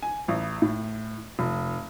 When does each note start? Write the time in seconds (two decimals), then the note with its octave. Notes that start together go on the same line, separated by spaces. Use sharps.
0.03 G#5
0.28 A1
0.62 A2
1.39 F1